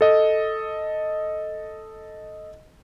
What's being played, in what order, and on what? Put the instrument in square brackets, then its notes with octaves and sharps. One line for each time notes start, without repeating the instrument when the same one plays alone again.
[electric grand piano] A4 D#5